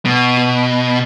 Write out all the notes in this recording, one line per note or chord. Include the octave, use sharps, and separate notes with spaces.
B2